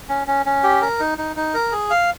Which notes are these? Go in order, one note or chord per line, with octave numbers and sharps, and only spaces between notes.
C#4
C#4
C#4
G4
A#4
D#4
D#4
D#4
A#4
G#4
F5